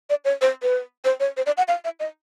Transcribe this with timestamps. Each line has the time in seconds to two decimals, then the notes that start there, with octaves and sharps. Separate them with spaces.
0.10 D5
0.25 C#5
0.41 C5
0.63 B4
1.05 C5
1.20 C#5
1.37 C5
1.46 D5
1.57 F#5
1.68 F5
1.85 E5
2.00 D#5